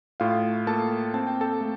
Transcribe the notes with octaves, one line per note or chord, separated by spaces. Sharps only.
A2 F4 F5
A#3 A4 A5
C4 A5
G5
A4 A5
A3